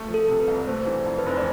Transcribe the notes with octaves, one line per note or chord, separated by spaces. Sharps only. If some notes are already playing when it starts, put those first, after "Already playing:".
Already playing: A3
F3
A4
C3
B4
C2
A3 C5
E3
F2
B4
F1 C5
D5